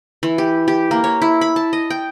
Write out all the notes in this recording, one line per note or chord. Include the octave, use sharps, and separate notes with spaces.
E3
G4
G4
A#3
C#5
E4
B5
A5
D#5
G5